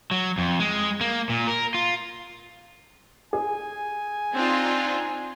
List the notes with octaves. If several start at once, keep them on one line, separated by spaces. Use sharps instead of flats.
F#3
F2
G#3
A#3
A#2
A#4
F4
G#4 G#5
C4 D4 D#4 F4